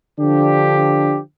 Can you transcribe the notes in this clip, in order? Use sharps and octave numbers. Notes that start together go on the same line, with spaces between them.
D3 F3 D4 G4